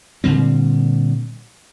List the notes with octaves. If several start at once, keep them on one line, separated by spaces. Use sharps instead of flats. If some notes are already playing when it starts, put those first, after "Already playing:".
A#2 D3 G3 C4